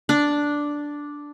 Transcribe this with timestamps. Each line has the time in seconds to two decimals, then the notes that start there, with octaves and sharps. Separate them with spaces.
0.09 D4